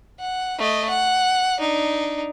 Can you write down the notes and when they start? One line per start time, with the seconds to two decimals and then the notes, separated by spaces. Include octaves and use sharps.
0.20 F#5
0.58 A3 D#5
0.89 F#5
1.58 D4 D#4